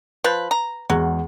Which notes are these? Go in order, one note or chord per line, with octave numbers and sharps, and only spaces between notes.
F3 B4
A#5
E2 F#3 G#3